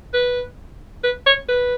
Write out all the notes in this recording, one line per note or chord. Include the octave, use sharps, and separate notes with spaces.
B4
B4
C#5
B4